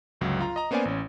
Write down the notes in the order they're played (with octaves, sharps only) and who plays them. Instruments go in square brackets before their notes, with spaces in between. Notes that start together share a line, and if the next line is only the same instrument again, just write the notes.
[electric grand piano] G1 C#2 F#3
F4 A#5
D#5 A#5
A#3 B3 C#4 C5 D5 G#5
A1 C#4